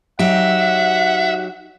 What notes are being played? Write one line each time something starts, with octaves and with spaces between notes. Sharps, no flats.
F#3 D#4 G4 E5 F#5